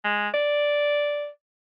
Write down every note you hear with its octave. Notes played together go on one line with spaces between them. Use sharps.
G#3
D5